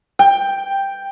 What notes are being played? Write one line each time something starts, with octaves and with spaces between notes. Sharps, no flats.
G5